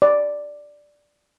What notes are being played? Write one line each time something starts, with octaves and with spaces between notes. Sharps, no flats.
D5